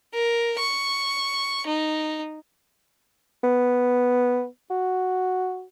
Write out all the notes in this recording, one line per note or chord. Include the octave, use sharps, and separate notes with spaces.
A#4
C#6
D#4
B3
F#4